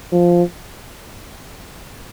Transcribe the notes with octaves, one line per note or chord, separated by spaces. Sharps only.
F3